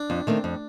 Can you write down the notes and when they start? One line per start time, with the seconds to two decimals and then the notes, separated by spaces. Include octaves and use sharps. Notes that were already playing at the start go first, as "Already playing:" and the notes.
Already playing: D4
0.10 F2
0.27 D#3 A3 C4
0.44 F2